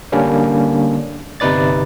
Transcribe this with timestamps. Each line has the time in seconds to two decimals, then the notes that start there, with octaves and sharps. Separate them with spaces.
0.12 D3 G3 A#3 C#4 D4
1.40 G1 C3 D#4 B4 D5 A6